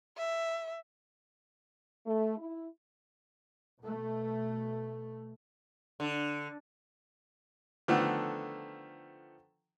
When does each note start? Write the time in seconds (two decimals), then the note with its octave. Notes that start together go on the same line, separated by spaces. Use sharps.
0.17 E5
2.06 A3
2.37 E4
3.81 B2 A3
6.00 D3
7.88 D3 D#3 F3 A3 B3